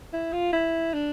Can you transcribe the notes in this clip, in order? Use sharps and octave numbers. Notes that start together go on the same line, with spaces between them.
E4
F4
E4
D4